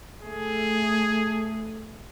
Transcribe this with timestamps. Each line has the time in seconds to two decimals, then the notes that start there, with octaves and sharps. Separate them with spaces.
0.22 A3 G#4